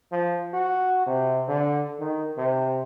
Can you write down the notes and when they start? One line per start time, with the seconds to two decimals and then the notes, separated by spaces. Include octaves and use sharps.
0.12 F3
0.53 F#4
1.07 C3
1.48 D3
2.00 D#3
2.38 C3